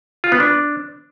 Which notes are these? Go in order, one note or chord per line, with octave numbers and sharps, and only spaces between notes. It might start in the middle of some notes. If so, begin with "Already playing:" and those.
F4
B3
D4